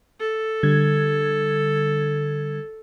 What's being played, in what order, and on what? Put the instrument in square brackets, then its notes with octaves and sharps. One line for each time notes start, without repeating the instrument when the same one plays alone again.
[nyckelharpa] A4
[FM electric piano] D3 G3 G#6